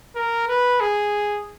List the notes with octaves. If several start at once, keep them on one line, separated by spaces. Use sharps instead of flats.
A#4
B4
G#4